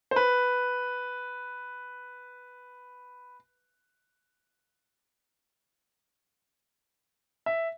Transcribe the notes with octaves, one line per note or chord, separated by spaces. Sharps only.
C5
B4
E5